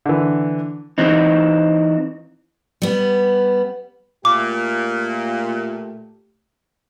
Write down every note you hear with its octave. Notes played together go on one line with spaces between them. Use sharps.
D3 E3
E3 C4 D#4
G3 B3
A#2 A3 G4 D6